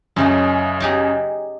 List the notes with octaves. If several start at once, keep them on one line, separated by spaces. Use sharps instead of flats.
F#2 C#3 A3 C#4 D#4
D#4 G4 G#4